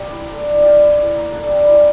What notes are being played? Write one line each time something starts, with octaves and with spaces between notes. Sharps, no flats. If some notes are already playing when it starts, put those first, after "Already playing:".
Already playing: D4 G4 A#4 D5 E5
E4
A4 D5
D4
G4 D5 F5
E4
A4 C#5
A#3
D4 A4
G3
C#4 E4 A#4